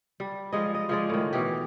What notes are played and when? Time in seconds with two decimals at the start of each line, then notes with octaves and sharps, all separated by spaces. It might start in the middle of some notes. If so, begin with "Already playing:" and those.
0.20 G3
0.53 F3 G3 G#3 D#5
0.75 D#5
0.89 F3 G#3 D5
1.10 A2 D#3
1.33 B2 E3 G4